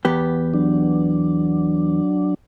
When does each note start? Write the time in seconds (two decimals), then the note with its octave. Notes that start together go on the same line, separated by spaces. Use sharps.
0.05 E2 B3 G4
0.54 F#3 D4